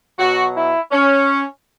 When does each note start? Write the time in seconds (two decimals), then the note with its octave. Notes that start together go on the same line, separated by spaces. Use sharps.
0.19 B2 F#3 F#4
0.55 E4
0.92 C#4